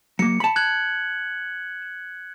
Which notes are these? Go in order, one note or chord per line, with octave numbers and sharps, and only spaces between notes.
F#3 A#3 C#7
A5 B5
F#6 G#6 F#7